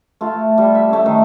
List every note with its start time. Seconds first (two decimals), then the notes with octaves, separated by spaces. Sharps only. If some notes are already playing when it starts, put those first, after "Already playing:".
0.21 A3 F4
0.58 G3
0.75 E5
0.89 A3 C#4
1.06 D#3